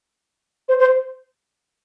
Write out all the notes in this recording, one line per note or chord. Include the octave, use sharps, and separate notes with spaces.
C5
C5